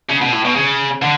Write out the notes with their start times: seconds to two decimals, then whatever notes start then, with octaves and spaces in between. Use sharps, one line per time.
0.09 C#3
0.21 B2
0.32 A2
0.45 B2
0.55 C#3
1.02 D3